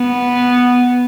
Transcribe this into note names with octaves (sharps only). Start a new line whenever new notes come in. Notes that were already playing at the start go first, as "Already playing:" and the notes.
Already playing: B3